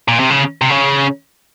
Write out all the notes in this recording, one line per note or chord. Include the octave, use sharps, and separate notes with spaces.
A#2
C3
C#3
C3
C#3